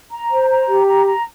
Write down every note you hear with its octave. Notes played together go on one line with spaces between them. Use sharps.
A#5
C5
A#5
G4
A#5
A#5